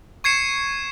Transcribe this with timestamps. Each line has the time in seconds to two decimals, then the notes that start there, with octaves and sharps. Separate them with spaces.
0.24 C#6 G#6 C7 C#7 E7